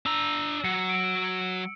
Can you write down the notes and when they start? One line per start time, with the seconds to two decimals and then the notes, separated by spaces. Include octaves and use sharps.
0.06 D4 A#5 E6
0.65 F#3 C#7
0.89 D7